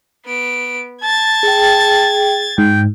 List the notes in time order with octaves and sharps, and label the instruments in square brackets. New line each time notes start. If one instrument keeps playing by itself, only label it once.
[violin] B3 D7
[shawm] A5 [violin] G#6 A6
[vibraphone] G#4 G5
[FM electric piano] G#2 [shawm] G5